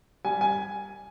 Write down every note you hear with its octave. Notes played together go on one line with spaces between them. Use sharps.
G3 G#5
G#5